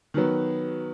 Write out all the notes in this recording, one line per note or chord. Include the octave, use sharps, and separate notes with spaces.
D#3 F#3 B3